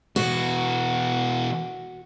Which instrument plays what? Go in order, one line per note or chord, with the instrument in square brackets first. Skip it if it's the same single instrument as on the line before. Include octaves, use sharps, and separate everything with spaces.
[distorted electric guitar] B2 E3 [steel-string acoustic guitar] F#4